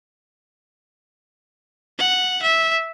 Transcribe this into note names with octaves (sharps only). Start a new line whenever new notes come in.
F#5
E5